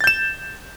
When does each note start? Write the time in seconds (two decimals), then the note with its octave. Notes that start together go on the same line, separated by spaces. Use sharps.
0.01 A6
0.04 G6
0.07 E7